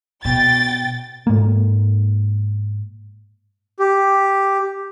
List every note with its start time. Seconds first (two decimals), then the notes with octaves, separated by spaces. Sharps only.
0.25 B2 G5 A6
1.27 G#2 A#3
3.79 G4